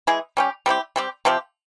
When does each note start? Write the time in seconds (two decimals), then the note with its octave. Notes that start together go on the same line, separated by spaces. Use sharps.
0.07 E3 G#3 E4 G#4
0.37 G3 C#4 G4
0.66 G3 C4 E4 G4
0.96 G3 C4 G4
1.25 C3 F3 C4 G4